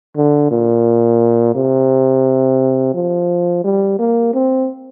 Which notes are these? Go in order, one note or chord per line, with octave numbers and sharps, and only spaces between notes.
D3
A#2
C3
F3
G3
A#3
C4